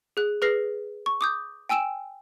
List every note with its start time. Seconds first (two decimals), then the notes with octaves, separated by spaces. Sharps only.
0.17 G#4 F#6
0.42 G#4 B4 F6 A#6 C7
1.06 C#6
1.21 D6 D#6 G6
1.69 G5 G#5 E6 D7 E7